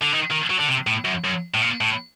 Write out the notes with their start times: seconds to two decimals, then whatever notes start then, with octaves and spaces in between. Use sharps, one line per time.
0.01 D3
0.12 D#3
0.30 D#3
0.50 F#3
0.59 D3
0.69 C3
0.87 A2
1.05 F#2
1.25 F#2
1.54 A2
1.62 A#2
1.81 A2